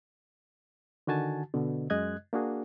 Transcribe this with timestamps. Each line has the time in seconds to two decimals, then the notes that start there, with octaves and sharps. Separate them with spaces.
1.07 D3 D#3 F#4 G#5 A5
1.54 B2 D3
1.90 F#2 G#3 D#5 F#6 G#6
2.33 A#3 D4 F#4 G#4